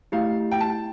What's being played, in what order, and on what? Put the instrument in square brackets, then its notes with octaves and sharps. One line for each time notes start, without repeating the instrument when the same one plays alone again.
[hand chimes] A3 E4 G4 [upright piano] F5
[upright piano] G5
A5